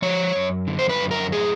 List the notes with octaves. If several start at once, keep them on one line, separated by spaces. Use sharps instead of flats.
F3 C#5
F#2
D3
C5
B4
F#2
A#4
A2 G#4